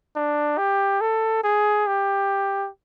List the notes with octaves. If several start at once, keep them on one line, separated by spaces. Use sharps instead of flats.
D4
G4
A4
G#4
G4